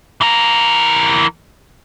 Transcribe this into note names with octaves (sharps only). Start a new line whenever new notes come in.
E3 A#4